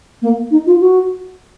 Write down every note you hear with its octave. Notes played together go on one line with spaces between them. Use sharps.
A#3
D#4
F4
F#4